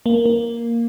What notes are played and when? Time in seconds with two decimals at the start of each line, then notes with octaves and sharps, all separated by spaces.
0.06 A#3
0.26 A#3